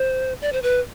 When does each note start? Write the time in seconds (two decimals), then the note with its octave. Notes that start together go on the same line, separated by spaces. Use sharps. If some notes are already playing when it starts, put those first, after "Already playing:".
Already playing: C5
0.41 D5
0.53 C5
0.62 B4